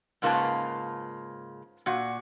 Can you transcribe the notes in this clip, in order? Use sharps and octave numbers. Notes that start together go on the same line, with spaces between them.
G#2 C#3 A#3 F4 B4 A5
A#2 F#4